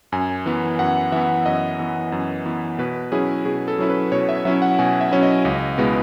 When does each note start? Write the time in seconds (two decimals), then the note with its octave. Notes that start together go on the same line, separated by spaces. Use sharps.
0.12 F#2 G#5
0.46 E3 B3
0.79 F#2 F#5
1.12 E3 B3 E5
1.46 F#2 D#5
1.79 E3 B3
2.12 F#2
2.46 E3 B3
2.79 B2 B4
3.12 F#3 C#4 E4 G#4
3.45 B2 G#4
3.68 A4
3.78 F#3 C#4 E4
3.90 B4
4.12 B2 C#5
4.29 E5
4.45 F#3 C#4 E4 E5
4.62 F#5
4.79 B2 G#5
5.01 E5
5.11 F#3 C#4 E4
5.23 D#5
5.45 C#2
5.78 B2 G#3 B3 E4